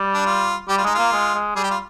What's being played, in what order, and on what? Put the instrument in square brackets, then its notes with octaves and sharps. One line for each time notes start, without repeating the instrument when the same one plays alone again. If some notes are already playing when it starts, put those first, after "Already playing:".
Already playing: [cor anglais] G3
[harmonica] D4
F4
[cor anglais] G3 [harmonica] G4
[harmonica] F4
[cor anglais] G#3 [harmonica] D#4
[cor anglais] A#3 [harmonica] F4
[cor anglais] G#3
G#3
[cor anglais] G3 [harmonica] G#4
[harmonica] G4
F4